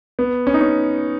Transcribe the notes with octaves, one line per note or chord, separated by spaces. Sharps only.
B3
C#4
D#4
C#4